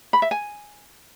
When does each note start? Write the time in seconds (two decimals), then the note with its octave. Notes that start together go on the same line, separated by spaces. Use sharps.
0.13 B5
0.22 E5
0.31 G#5